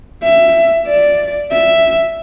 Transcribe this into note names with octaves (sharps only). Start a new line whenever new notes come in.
E5
D5
E5